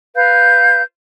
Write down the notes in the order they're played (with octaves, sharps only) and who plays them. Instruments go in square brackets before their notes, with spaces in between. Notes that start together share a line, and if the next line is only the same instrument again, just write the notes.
[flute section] B4 F5 G6